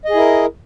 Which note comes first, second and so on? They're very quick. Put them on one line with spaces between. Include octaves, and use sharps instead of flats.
D#5 G#4 E4 A#4